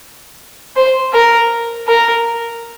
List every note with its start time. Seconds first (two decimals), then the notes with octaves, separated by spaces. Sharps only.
0.76 C5
1.13 A#4
1.88 A#4